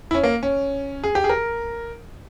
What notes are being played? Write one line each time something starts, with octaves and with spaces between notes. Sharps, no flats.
E4
C#4
A#3
C#4
G#4
G4
G#4
A#4